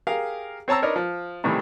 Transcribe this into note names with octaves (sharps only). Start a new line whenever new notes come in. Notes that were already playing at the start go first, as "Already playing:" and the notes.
G4 G#4 A#4 F5
C4 C#5 A5 A#5 E6
D4 D#4 A#4 B4 C#5
F3
A2 C3 D#3 E3 G3 C4